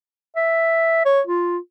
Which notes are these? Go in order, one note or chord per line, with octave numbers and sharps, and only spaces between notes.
E5
C#5
F4